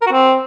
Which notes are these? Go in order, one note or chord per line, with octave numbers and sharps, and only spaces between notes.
A#4
F#4
C4